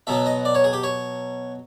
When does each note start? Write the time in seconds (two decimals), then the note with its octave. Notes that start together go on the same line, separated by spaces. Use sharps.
0.07 B2 F#3 B3 E5
0.26 D#5
0.45 D5
0.55 C#5
0.64 G#4
0.73 G4
0.83 C#5